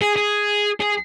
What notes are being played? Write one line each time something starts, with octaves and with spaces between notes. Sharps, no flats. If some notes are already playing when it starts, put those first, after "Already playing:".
G#4
G#4
G#4